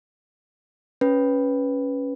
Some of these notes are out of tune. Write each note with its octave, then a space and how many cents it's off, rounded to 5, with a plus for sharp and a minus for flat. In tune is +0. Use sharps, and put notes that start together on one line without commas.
C#4 +0 B4 +0